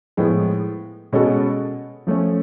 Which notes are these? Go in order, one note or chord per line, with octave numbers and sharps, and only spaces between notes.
A2 F3 G#3 B3
B2 G#3 C#4 F#4 A4
F3 A3 C#4